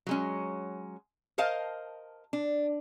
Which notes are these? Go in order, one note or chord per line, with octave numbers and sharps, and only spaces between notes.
F#3 G#3 C#4
A#4 C5 D#5 F5 A5
D4